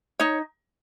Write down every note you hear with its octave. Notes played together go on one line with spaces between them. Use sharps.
D#4 C#5